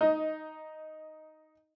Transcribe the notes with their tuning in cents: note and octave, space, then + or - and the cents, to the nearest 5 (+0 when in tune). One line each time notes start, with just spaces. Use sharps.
D#4 +0 D#5 +15